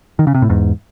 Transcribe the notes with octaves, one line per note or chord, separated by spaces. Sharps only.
D#3
C#3
C3
A2
E2 G#2